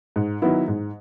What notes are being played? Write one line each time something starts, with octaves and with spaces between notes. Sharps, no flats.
G#2
D#3 F#3 B3 E4
G#2